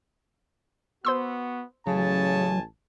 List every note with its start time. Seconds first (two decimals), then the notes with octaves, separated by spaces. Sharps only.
1.05 B3 F#4 C5 C6 E6
1.87 A1 C#3 F#3 G#5 A5